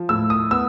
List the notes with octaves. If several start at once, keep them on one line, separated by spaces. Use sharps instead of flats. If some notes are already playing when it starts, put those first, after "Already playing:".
Already playing: F3
A2 E6
D#6
B3 E6